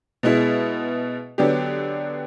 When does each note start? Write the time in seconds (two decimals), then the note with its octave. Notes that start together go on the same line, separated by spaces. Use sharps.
0.23 B2 G#3 B3 E4
1.38 D3 F#3 B3 D4 G4